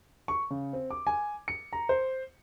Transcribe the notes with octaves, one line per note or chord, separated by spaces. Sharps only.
C#6
C#3
C4
D6
G#5
C#7
A#5
C5